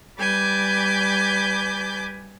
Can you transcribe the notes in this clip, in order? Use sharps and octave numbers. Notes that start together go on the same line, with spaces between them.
G3 B4 D5 G#5 D6 G6